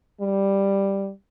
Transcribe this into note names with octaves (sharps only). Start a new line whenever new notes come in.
G3